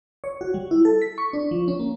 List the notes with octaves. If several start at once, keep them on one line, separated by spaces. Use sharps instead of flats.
C#5
F#4
G3
E4
A4
B6
C#6
D4
F3
C#4
A#3